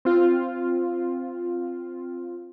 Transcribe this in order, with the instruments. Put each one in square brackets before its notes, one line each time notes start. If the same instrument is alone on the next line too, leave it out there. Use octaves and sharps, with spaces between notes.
[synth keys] C4 F4